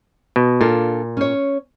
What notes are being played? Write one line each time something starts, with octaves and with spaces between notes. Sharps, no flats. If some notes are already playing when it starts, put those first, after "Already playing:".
B2
A#2 D4 F4 A4
C#4 C#5